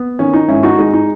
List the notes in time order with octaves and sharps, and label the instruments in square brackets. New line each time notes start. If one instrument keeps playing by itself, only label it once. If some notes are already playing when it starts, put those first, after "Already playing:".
Already playing: [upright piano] B3
D#3 C#4
D#4
G#2 C#4 E4
D#4 F#4
G#3 D#4
D#4